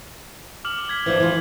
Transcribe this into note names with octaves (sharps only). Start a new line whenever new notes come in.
D6 F6 F#7
D6 G#6 B6
E3 F3 D4 F#7
E3 F4